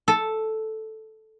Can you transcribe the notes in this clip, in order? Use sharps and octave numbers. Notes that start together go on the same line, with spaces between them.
A4